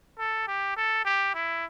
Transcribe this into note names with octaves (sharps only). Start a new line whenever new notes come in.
A4
G4
A4
G4
E4